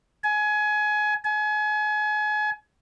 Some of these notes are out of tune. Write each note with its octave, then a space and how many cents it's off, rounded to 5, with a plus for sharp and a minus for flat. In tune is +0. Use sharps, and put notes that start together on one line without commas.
G#5 +25
G#5 +35